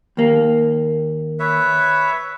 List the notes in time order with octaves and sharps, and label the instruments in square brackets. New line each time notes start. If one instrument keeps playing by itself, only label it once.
[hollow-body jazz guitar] D#2 A#3
[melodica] B4 C#5 E5